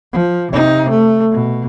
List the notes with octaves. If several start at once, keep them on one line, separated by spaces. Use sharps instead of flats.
F3
C3 D#4
A3
B2